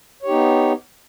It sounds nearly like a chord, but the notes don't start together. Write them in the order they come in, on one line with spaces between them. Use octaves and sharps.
C#5 G4 D#4 B3